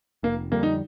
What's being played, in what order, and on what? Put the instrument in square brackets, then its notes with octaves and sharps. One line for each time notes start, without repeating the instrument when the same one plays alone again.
[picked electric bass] F1 [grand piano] A#3
[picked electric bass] F2 D3 G3 [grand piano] A#3
[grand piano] D#4